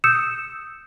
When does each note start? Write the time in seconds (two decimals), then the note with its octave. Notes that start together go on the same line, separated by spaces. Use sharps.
0.04 D#6 E6 G6 C#7 E7